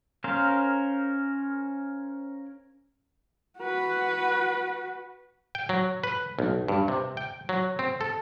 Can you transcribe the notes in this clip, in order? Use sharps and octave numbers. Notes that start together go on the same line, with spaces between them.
C#4 A#4 C5 F5
F#4 B4
G5
F#3
B4
B1
G2
C3
G5
F#3
C4
A4